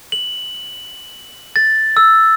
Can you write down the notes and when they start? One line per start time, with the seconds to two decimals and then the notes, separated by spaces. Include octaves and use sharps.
0.12 F#7
1.56 A6
1.97 E6